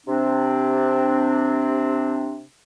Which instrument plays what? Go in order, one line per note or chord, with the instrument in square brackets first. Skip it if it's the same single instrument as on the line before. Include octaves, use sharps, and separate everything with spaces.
[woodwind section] C3 C4 D4